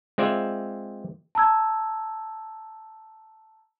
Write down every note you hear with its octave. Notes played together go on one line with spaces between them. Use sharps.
G#3 C4 F4 D5 E5
A5 A#5 E6 G#6